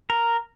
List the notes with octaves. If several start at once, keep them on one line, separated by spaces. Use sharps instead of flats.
A#4